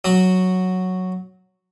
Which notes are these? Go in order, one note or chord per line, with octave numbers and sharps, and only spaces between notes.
F#3 F#4